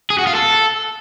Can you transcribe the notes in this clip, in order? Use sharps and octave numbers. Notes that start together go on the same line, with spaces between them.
G#4
F#4
F4
A4